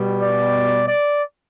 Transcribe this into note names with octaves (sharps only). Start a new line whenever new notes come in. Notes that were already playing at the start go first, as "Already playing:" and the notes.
Already playing: B2 G3
D5
D5